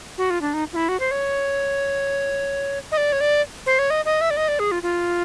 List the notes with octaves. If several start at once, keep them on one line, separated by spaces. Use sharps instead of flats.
F#4
F4
D4
D#4
F4
E4
F#4
C5
C#5
D#5
D5
C#5
D5
C5
C#5
D#5
D#5
E5
D5
D#5
D5
G#4
F4
F4